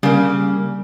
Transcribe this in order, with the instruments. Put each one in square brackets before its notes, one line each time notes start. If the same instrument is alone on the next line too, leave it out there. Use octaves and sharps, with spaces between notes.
[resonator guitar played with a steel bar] C#3 A#3 [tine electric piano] G3